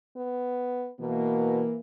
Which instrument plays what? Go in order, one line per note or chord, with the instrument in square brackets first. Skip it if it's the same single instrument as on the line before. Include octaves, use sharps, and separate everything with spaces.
[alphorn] B3
[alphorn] B2 [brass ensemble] E3 A#3